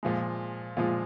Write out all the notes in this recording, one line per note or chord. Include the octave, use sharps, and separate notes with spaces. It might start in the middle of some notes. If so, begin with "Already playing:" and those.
A#2 F3 G#3
A#2 F3 G#3